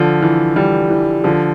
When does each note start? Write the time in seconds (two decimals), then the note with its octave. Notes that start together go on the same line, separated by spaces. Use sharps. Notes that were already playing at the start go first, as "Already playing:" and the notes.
Already playing: D3 F3
0.22 E3
0.56 E3 G3
0.90 E3
1.24 D3 F3